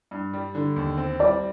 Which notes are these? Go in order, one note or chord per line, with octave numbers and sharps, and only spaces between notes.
G2
G3
D3
D#2
C4
G3 D5